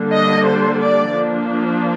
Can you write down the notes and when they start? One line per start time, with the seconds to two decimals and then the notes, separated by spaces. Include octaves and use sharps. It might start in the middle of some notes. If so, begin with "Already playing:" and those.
Already playing: D3 G3 A#3 D4
0.11 D#5
0.45 C5
0.80 D5
1.14 F3 A#3 D4